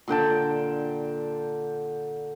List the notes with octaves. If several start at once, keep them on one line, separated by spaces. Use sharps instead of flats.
A#2 D3 G5 A5